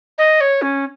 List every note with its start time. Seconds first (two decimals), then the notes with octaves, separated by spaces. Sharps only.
0.18 D#5
0.41 C#5
0.62 C#4